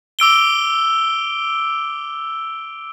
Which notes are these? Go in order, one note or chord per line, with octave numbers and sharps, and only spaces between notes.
D6 E6 D7 G7